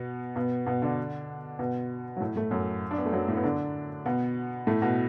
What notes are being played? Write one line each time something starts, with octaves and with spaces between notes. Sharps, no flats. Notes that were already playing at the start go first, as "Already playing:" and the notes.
Already playing: B2 B3
B2 B3
B2 B3
D3 D4
B2 B3
F#3
A2 A3
A2 A3
F#2 F#3
D4
B3
A3
F#2 F#3
A2 A3
B3
D3 D4
B2 B3
A2 A3
B2 B3